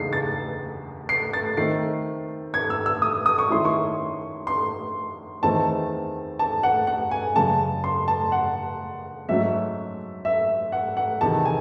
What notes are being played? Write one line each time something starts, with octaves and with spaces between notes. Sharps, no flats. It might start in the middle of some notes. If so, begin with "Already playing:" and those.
Already playing: E2 C#3 G#3 D#4 C7
A6
C7
A6
D#3 A3 C4 C7
G#6
E6
E6
D#6
D#6
C#6
D#3 G#3 C#4 E4 C6
C#6
C6
E2 D#3 A3 C4 A5
A5
F#5
F#5
G#5
F#2 C#3 G#3 A5
C6
A5
F#5
G#2 F#3 A3 C#4 E5
E5
F#5
F#5
E2 C3 D#3 A5
G#5